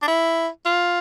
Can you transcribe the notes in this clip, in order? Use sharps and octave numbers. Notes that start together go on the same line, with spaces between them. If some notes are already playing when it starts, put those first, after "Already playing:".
D4
E4
F4